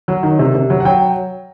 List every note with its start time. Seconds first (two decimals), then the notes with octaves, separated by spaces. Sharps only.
0.08 F#3
0.23 D#3
0.39 C3
0.55 C3
0.70 F#3
0.80 F#5
0.85 F#3 G5